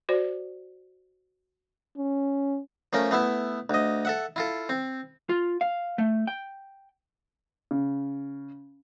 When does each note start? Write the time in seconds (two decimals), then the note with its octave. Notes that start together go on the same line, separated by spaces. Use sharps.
0.09 F#4 C5 D5
1.97 C#4
2.93 F3 A3 C#4 A#4
3.11 A3 B3 E4 E5
3.70 D2 D#5
4.05 A4 E5 F#5
4.36 E4 F4 A4
4.69 C4
5.29 F4
5.61 F5
5.98 A3
6.27 G5
7.71 C#3